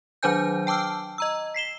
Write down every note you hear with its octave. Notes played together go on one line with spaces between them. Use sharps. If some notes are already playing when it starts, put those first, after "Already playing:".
D#3 F#3 D4 C5 G#5 G6
G5 A5 D6 E6 F6
D#5 A#5 E6
B6 C7 E7 G7